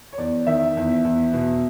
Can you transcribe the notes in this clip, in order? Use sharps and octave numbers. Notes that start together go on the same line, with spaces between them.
C#5
E2 D5
D#3 E5
E2
E2
B2